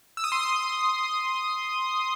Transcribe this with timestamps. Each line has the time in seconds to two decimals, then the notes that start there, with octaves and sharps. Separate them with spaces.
0.17 E6
0.24 D#6
0.32 C6
0.39 D#6